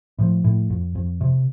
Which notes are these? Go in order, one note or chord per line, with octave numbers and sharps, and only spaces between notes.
A2 F3
A2
F2
F2
C3